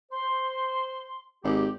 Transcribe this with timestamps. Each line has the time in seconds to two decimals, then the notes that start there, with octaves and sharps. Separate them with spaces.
0.11 C5 C6
1.44 G#1 G4